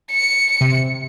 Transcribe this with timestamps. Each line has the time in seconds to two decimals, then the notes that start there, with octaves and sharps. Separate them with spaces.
0.11 C#7
0.61 C3